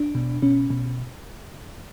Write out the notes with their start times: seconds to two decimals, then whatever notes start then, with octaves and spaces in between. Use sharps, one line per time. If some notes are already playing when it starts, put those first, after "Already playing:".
Already playing: D4
0.15 B2
0.42 B2 C#4
0.70 B2